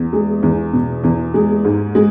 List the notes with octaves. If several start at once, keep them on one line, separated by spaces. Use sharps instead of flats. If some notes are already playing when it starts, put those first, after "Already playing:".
Already playing: E2
G#3
E2
B2
E2
G#3
G#2
G#3